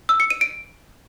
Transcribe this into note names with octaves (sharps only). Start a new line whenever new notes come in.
E6
C#7
D#7
D7